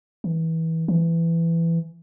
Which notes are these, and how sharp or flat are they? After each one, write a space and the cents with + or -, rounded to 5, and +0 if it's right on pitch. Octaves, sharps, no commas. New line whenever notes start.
E3 -25
E3 +15